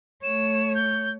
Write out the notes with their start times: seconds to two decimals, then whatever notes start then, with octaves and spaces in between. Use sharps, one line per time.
0.23 A3 C#5 E7
0.75 G6